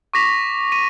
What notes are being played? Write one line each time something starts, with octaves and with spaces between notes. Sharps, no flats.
C#6 D6 A#6 B6 F7
D#7